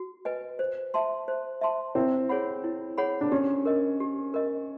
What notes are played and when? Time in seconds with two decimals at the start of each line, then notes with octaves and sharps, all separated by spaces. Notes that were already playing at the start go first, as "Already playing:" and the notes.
Already playing: F#4
0.25 B4 D#5 G#5
0.59 C5
0.94 E5 A5 C6
1.28 C5
1.61 E5 A5 C6
1.95 C4 E4
2.29 G#4 C#5 F#5 B5
2.64 E4
2.98 G#4 C#5 F#5 B5
3.21 D4
3.32 C#4 G4
3.65 A#4 D#5
4.00 G4
4.34 A#4 D#5